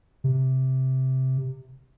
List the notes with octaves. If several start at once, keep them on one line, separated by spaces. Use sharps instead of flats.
C3